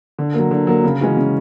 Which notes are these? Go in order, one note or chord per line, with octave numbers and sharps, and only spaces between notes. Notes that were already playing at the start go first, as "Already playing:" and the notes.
D3
F#3 A#3
D3
F#3 A#3
C#3
E3 G#3 C#4 F#4
C#3